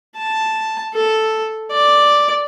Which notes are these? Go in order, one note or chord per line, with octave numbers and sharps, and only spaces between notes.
A5
A4
D5